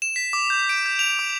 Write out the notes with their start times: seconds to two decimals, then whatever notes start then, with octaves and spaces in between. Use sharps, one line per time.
0.02 E7
0.16 B6
0.33 D6
0.50 G6
0.69 D7
0.86 G6
0.99 F7
1.19 D6